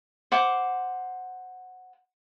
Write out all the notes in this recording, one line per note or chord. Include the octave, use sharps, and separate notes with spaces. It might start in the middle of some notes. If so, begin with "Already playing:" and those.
C5 F#5 D6